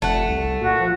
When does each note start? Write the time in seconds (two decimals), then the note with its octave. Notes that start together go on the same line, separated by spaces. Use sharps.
0.02 F1 A3 F#5
0.28 C2
0.61 A#2 F#4
0.79 F3